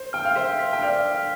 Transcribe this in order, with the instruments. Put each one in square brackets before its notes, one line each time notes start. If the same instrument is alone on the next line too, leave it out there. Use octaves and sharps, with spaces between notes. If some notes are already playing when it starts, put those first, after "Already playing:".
Already playing: [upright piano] C5
[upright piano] G5 [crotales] F6
[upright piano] F5
[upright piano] C5 E5 [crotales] B6
[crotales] B6
[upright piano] G5
[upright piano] D5 F5 [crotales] F6
[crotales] F6